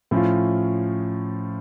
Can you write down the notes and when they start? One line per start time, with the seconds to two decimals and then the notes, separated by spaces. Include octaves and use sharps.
0.11 A2 F3 C#4 F4